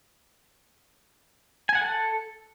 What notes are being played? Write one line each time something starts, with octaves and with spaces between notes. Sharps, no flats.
G#5
F#5
A4